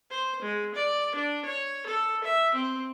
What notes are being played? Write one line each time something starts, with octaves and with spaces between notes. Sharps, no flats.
C5
G#3
D5
D4
C#5
A4
E5
C4